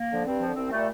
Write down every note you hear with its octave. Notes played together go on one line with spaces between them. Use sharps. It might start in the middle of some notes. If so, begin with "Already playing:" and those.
Already playing: A#3
D3 F3
G2 C4
D3 F3
C2 C4
A#2 G3 A3